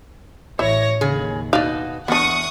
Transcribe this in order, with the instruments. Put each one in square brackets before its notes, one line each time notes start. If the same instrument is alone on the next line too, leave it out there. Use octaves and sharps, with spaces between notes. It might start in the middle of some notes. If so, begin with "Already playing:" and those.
[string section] A1 C#5 A#6 [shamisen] E4 E5
[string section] D#2 [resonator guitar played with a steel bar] C#3 G#4
[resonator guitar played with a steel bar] B2 D#4 F#4 [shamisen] D5 F5
[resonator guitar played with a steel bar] E2 [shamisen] B3 D4 [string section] F#5 C#6 D#6